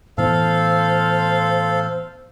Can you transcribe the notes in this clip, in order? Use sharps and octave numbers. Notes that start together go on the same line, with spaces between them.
A2 E3 B3 A4 C5 F5